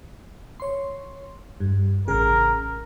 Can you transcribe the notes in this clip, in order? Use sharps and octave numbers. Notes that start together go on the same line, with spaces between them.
C#5 C6
G2
A1 C#3 G#4 A#4